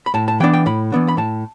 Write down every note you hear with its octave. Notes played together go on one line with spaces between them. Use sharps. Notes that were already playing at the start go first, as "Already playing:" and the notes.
B5
A2 A5
A5
E3 B3 D4 G5
G5
A2 B5
E3 B3 D4
B5
A2 A5